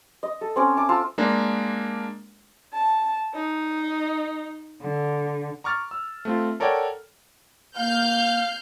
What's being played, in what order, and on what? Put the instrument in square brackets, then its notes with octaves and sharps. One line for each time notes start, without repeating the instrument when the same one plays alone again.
[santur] D#5
A4
C4 C#4 D6
A5 D6
F4 A5 E6
[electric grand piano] G#3 A#3 D4 A#4
[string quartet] A5
D#4
D3
[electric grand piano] A#5 C#6 D6 F6 A6
E6
A3 C4 F4
A4 A#4 C#5 D5 F#5 G5
[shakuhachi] A#3 [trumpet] F5 [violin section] F6 G6